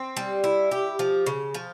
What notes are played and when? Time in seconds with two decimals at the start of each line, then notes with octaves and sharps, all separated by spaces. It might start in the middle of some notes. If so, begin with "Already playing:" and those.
Already playing: C4
0.17 G3
0.44 E4
0.71 G4
0.99 F3
1.26 C#3
1.54 F3